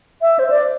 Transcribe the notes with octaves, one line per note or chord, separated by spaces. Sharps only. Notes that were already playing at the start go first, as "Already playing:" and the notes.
E5
C5
D5